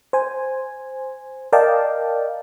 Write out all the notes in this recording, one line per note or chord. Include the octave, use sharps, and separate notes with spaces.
C5 G#5
A#4 D5 D#5 F5 G5 A5